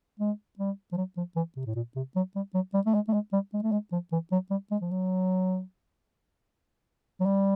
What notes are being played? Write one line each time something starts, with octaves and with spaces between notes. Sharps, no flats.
G#3
G3
F3
F#3
F3
E3
C3
A2
A#2
C3
F#3
G3
F#3
G3
A3
G#3
A3
G#3
G3
G#3
A3
G#3
F3
E3
F#3
G3
G#3
F3
F#3
F#3
G3